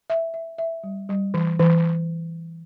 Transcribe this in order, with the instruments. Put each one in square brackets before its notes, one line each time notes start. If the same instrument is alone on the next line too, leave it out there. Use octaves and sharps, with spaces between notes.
[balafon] E5
E5
E5
G3
G3
E3
E3